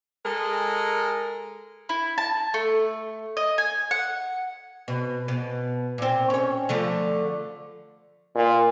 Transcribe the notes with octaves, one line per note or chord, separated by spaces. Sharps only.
G#3 A4 A#4
E4
A5
A3
D#5
G#5
F#5
B2
B2
A#2 C4
C#4 C#5
D3 F3 A3
A#2